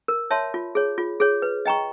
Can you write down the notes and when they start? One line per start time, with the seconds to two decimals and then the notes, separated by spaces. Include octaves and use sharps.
0.08 A#4
0.30 C#5 E5 A5 C6
0.54 F4
0.75 G#4 C#5
0.98 F4
1.20 G#4 C#5
1.42 B4
1.66 D#5 G5 A#5 C#6